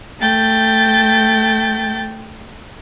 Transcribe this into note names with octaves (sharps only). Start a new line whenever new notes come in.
A3 G5 G6 A6